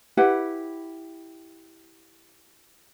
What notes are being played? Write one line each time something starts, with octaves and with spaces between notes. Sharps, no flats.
E4 G4 B4 F#5